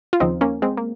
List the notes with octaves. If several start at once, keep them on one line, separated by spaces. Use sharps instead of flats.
F4
D#2 C#3 F3 C4 D#4
A#3 C#4
G#3 C4
A#3